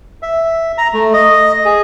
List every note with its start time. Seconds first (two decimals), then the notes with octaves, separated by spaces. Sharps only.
0.23 E5
0.78 A#5
0.94 A3
1.14 D#5
1.65 G#4